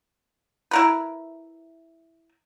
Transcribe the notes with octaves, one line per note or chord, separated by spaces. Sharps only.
E4 A#4 B4